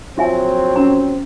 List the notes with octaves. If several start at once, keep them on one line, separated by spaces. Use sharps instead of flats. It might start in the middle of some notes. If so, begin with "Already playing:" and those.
A#1 F#3 C4 F4 E5 G#5
C#4 A#5